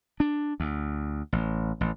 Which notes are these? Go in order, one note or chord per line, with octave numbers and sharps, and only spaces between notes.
D4
D2
A1
A1